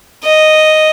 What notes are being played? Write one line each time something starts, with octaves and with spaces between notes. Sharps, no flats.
D#5